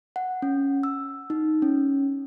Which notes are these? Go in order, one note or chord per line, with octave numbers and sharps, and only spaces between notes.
F#5
C#4
E6
D#4
C#4